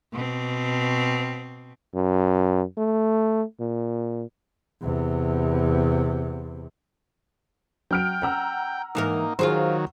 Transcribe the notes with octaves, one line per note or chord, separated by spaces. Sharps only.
B2 C4
F#2
A3
A#2
E2 C3
F#3 G5 F6 D7
F#5 A#5 E6
G#2 E3 A#3 D#4 A#4
D#3 F#3 F4 G#4 C5